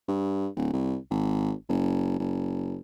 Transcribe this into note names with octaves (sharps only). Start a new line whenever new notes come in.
G2
D1
C2
G#1
F#1
F#1